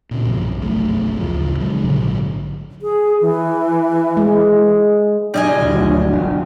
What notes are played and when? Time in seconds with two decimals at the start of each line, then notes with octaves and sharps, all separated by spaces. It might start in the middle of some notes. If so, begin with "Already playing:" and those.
0.11 A#2 C#3
0.26 B1 G2 F3
0.60 G1 C2 F#2 A3
1.20 A1 D2 C#3 F3
1.60 C#3 F#3 G#3
1.84 A#1 G#2 D3 F#3
2.82 G#4
3.21 E3
4.17 G#3
5.34 F#1 G2 G3 G#3 D#5 G#5 A#5
5.59 D#2 B2 D3
5.75 G1 D2 G2 F3 F#3
6.12 E1